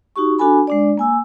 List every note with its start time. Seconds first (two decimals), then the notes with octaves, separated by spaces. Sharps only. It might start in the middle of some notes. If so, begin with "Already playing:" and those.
0.16 D#4 F#4 G4 C#6
0.39 D4 F#4 A4 G#5 B5
0.67 G#3 D4 D5
0.98 A#3 G#5 E6